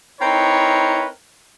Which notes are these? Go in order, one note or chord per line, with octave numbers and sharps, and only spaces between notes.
C4 D#4 E4 A#4 B4 C#5